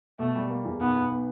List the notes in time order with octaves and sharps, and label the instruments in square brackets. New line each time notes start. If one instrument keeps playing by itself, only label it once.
[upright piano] B2 [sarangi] A3
[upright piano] G3
A#3
E2
[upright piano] B1 [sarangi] B3
[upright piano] B1
B3